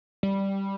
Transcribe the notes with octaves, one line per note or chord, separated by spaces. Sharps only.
G3